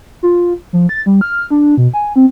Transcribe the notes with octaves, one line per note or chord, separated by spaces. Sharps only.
F4
F3
A6
G3
F6
D4
B2
G#5
C4